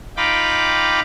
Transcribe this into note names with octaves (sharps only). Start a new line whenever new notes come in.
D#4 F4 G5 B5 D6